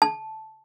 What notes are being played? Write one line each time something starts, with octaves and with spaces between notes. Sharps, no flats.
A5